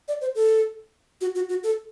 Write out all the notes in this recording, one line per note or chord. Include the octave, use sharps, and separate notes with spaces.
D5
C5
A4
F#4
F#4
F#4
A4